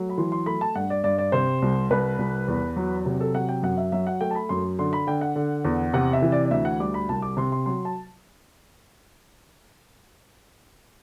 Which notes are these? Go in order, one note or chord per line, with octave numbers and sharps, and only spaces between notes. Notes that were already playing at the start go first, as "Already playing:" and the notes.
Already playing: F#3 A3
B5
E3 C6
C6
A3 B5
A5
G2 F#5
D5
G2 D5
D5
C3 C5
C2
C2 B4
C2
E2
F#3
C3
A4
F#3 F#5
G5
F#2 F#5
E5
F#3 E5
F#5
A3 G5
A5
B5
F#2 C6
D3 C6
B5
D3 G5
F#5
D3
E2
C3 F#5
E5
E3
D5
D5
D2 E5
F#5
G3 D6
B5
C2 A5
D6
C3 C6
C6
F#3 C6
A5